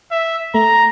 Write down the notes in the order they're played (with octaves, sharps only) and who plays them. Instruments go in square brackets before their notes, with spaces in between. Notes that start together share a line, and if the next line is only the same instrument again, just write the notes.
[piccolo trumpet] E5
[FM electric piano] A3 [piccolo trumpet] A#5